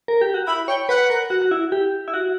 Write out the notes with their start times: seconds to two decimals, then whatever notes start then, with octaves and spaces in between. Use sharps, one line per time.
0.08 A#4
0.21 G4
0.34 F#4
0.47 E4 B5
0.68 C#5 G5
0.89 B4 F#5
1.10 A#4
1.30 F#4
1.42 F#4
1.51 E4
1.72 G4
2.08 E4
2.14 F#4